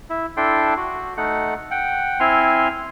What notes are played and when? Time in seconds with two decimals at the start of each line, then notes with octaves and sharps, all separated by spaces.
0.10 E4
0.37 D4 E4 A4 G5 C6
0.77 F#4
1.17 A3 D#4 F#5
1.71 F#5 G5
2.20 C4 E4 G#5 C6 F6